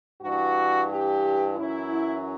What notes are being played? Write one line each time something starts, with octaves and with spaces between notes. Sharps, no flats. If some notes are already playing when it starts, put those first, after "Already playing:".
G2 E3 F#4
G4
F#2 E3 E4